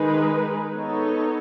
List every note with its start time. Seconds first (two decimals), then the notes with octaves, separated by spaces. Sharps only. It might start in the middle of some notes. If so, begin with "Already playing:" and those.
Already playing: D#3 G#3 D#4 G#4 B4
0.72 B3 D#4 A4 C#5